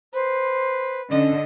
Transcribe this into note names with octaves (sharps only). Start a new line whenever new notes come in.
B4 C5
D3 C#4 D#5